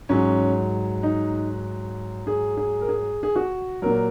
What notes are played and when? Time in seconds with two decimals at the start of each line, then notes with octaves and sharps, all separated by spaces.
0.09 G#2 F#3 C#4
1.03 D#4
2.27 G#4
2.57 G#4
2.81 A#4
2.89 G#4
3.23 G#4
3.36 F#4
3.82 A#2 F#3 A#4